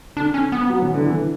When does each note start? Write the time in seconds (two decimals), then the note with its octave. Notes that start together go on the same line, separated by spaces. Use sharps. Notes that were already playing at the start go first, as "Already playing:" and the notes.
0.16 D3 D4
0.34 C#4
0.52 B3
0.70 F#3
0.82 E3
0.94 D3
1.06 E3